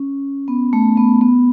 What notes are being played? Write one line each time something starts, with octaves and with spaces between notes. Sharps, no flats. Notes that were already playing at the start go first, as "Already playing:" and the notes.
Already playing: C#4
B3
A3
B3
B3